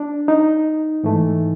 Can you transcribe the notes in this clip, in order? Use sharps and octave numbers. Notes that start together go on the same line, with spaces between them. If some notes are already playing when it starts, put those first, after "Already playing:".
Already playing: D4
D#4
G#2 E3 A3